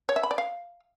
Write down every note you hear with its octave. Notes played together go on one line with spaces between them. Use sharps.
C#5
E5
B5
D5
F5